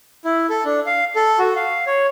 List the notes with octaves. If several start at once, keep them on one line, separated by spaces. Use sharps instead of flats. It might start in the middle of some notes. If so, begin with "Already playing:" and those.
E4
A4
D4
F5
A4
F#4
F5
C#5